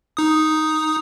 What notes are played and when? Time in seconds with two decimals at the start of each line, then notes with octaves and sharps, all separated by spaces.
0.17 D#4 D#6